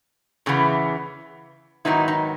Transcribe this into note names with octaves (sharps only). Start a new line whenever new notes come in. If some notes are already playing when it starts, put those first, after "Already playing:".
E2 C#3 E3 B3
G#2 D#3 F#3 B3 D#4 E4
D#4